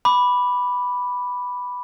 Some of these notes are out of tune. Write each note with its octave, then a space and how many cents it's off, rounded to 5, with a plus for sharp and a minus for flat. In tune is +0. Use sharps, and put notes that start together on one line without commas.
B5 +0 D6 +0